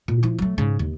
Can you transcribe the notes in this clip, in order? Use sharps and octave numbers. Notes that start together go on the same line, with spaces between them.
A#2
F3 E4
F#3 A3
G#2 C#3
D#2